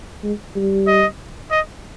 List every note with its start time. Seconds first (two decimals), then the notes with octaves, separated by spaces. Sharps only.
0.23 G#3
0.55 G3
0.87 D#5
1.51 D#5